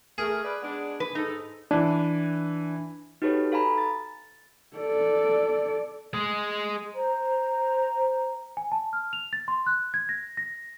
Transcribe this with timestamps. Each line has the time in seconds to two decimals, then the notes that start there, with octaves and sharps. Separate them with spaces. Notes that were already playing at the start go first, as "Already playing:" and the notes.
0.18 A3 G#4 A#4
0.43 B4 D5
0.62 G#3 B3 D4
1.00 B4
1.15 G#2 D#4 A4
1.71 E3 D4
3.22 D#4 F#4 G4 A4 B4 C#5
3.52 A4 F5 G#5 A#5 B5
3.78 A6
4.77 A4 D5
6.14 G#3 G#4
6.93 C5 A#5
8.57 G#5
8.72 A5
8.93 F6
9.13 F7
9.33 A6
9.48 C6
9.67 F#6
9.94 G#6
10.09 A#6
10.37 A#6